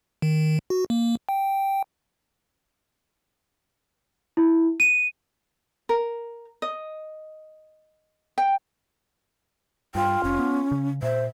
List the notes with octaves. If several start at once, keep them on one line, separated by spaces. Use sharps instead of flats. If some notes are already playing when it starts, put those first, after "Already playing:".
D#3
F#4
A#3
G5
E4
D#7
A#4
D#5
G5
G2 F4 G5
F1 C#4
B3
C#3
A#2 C5 E5